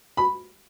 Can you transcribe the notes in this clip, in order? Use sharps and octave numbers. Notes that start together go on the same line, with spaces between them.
B5